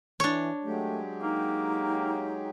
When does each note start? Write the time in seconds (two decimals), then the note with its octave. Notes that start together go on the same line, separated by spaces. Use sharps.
0.20 E3 D4 C#5
0.64 F#3 G#3 A3 G4
1.22 A#3 D#4